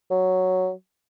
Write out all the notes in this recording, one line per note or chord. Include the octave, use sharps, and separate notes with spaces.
F#3